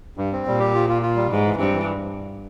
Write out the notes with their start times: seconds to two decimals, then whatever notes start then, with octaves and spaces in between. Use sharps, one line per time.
0.17 G2
0.33 C4
0.47 A#2 G3
0.60 G4
0.74 F4
0.89 F4
1.02 F4
1.16 G3
1.30 G#2 E3
1.44 E3
1.58 G2 C4
1.73 E3